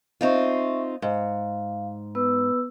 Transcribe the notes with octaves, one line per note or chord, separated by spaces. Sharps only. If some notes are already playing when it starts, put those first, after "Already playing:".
C4 D#4 F4 E5 C#6
G#2 F5
B3 B4 E6